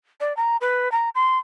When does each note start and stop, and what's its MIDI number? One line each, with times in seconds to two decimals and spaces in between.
0.20 0.35 74
0.37 0.57 82
0.61 0.91 71
0.92 1.09 82
1.15 1.38 84